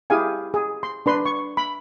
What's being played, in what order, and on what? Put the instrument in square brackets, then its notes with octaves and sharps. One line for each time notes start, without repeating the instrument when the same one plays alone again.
[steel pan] E4 G4 G#4 F5 G#5
G#4
C6
D4 B4 C6
C#6
B5